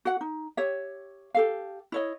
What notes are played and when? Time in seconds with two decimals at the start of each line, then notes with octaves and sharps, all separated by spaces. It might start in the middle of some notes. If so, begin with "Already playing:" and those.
0.05 F#4 F#5
0.21 D#4
0.57 G4 C#5 E5
1.34 G4 A4 F5
1.92 E4 C#5 D#5